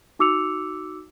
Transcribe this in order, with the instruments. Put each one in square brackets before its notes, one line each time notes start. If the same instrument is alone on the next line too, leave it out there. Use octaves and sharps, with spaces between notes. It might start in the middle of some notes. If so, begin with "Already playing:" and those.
[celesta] D#4 F#4 D6 E6 C#7 F7